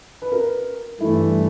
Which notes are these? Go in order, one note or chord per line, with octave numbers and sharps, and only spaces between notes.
B4
A#4
G2 E3 A3 E4